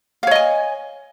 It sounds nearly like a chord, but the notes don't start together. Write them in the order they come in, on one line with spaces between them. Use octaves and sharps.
F5 C#5 D#5 G#5